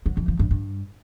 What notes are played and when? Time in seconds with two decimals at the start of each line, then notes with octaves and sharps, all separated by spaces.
0.06 F#3
0.17 F2
0.28 F3
0.39 G2
0.51 G2